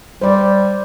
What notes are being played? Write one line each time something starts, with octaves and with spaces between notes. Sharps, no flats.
G3 C5 D5